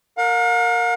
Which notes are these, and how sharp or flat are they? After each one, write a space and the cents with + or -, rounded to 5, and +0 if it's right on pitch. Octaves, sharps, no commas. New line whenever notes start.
A#4 -15 F5 +45